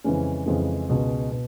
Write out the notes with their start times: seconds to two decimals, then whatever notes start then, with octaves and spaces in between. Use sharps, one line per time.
0.04 F2 C#3 E3 G#3 C#4
0.46 F2 C#3 E3 G#3 C#4
0.89 C#2 B2 G#3
1.32 B2